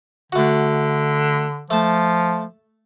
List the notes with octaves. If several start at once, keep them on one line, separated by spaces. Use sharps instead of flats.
D3 A3 F#4
F3 A3 A5